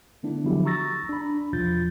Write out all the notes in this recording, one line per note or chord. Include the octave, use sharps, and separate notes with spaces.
D3 A3 B3 D4 E4
D3 F3 F#3 E4 F#4 G4
A#5 C#6 E6 A6 A#6
D4 B5
E2 B2 F3 F4 G6 A6